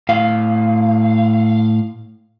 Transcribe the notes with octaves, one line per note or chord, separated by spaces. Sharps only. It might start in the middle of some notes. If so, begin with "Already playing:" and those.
A2 F5